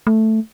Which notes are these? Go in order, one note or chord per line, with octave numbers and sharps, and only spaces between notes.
A3